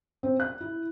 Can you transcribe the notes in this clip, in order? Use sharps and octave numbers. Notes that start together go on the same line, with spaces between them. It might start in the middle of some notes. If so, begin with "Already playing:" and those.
C4
F#6
E4